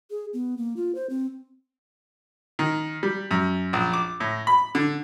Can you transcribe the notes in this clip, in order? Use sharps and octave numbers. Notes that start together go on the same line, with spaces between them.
G#4
B3
A#3
F4
C5
C4
D#3
G3
F#2
A#1
D6
A2
B5
D3